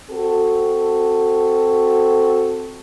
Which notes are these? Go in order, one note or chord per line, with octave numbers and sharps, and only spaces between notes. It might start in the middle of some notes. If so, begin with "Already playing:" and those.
C4 F#4 A4